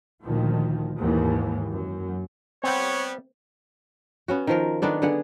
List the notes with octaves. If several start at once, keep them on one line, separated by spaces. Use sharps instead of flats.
D2 A#2 D#3 F3
D#2 G#2 E3
F#2
G3 B3 C4 C#5 G5
B3 C#4 F#4
D#3 F3 A#4
D#3 B3 D4 A4
D3 B3 G#4 F#5